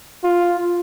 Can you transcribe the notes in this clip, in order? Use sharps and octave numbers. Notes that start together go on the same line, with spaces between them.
F4